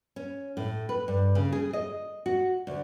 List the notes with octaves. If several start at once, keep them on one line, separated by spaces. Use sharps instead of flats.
C#4
A2
B4
G2
C#3
G#4
D#5
F#4
D2